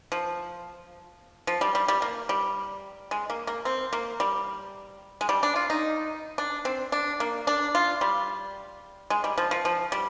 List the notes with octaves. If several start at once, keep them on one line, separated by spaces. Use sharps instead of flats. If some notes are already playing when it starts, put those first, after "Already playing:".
F3
F3
G3
G3
G3
A#3
G3
G#3
A#3
A#3
C4
A#3
G3
G#3
G3
D4
F4
D#4
D4
C4
D4
A#3
D4
F4
G3
G#3
G3
F3
F3
F3
G3